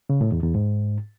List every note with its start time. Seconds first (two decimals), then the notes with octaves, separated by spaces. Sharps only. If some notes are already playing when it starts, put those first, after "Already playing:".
0.09 C#3
0.21 A2
0.32 E2
0.43 E2
0.55 G#2